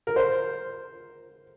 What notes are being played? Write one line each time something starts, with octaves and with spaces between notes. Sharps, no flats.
A#4
C5